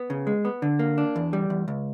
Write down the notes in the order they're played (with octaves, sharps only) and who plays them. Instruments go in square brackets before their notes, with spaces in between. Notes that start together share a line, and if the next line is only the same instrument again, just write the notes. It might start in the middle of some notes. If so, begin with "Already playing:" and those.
Already playing: [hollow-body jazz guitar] B3
C#3
G#3
B3
D3
A#3
D4
E2
G3
E2
C#2